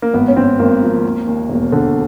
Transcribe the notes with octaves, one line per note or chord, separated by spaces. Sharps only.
A#3
G#1 B3
C#4
G#1 C4
G#1 A#3
F3
D#2
D#2
E1
D3